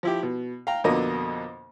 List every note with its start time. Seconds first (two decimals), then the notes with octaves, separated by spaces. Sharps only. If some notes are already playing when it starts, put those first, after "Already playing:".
0.03 F3 E4 G4
0.23 B2
0.67 F5 G5 A#5
0.84 F2 B2 D3 A#3 D#5